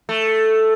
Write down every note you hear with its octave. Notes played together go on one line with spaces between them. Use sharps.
A3